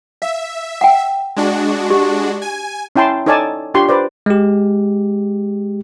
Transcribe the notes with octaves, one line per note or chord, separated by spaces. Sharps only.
E5 F5
F#5 G5
G#3 D4 F#4
G4
G#5
C#4 E4 G5 A5 C6
D#4 A4 C#5 D5 G#5 A5
D4 F4 G4 C6 C#6
B4 C5 D5
G#3 G4